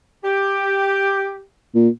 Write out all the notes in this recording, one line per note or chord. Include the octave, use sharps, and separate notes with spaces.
G4
A#2